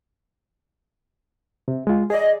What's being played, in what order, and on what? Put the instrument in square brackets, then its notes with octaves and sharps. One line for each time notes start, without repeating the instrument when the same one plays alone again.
[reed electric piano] C3
G#3 F4
[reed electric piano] G#4 D5 [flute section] D#5